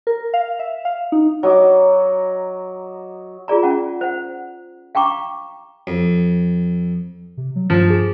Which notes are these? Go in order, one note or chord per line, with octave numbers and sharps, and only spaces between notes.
A#4
F5
E5
F5
D#4
F#3 D#5 D6
F4 G#4 D5 A#5
C#4 F#5
C5 F#5
F5 G5 A#5 C#6 D6
F2
C3
F#3
G2 F3
G#4